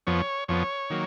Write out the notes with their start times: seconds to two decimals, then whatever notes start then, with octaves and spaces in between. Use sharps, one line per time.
0.07 F2 F3 B3 C#5
0.48 F2 F3 B3 C#5
0.90 D#3 F#3 A#3